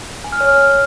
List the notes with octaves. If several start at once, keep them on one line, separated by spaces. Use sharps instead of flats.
G#5
F6
C#5
F6